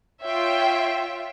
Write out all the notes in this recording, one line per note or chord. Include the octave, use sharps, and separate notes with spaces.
F4 C#5 E5 G5